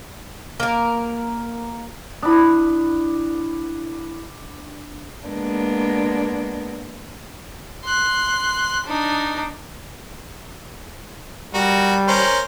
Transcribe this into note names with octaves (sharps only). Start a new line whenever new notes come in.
A#3 A#4
D4 E4 B5 D#6
G#3 A#3 B3 D4
C6 F#6
D4 D#4
G3 F#4 A#4
C#4 A#4 C5